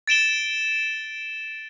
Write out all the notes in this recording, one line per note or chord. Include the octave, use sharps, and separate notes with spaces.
A6 D7 E7 G7